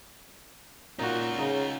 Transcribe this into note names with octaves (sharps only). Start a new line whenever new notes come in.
A#2 C#4 D#4 F4 F#4
C#3 D#4